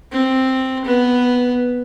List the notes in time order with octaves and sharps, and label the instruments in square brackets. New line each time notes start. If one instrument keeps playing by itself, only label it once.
[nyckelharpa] C4
B3